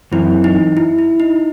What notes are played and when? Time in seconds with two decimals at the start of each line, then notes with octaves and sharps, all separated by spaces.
0.12 F#2 E3 C4 E4
0.44 D#4
0.77 E4
0.99 E4
1.20 D#4